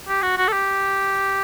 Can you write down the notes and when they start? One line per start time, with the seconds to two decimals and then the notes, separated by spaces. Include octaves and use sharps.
0.08 G4
0.23 F#4
0.37 F#4
0.48 A4
0.53 G4